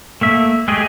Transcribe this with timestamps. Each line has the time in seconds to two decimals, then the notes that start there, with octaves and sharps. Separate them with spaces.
0.21 A3 A#3 E5
0.68 G#3 A3 G4 G#4 D#5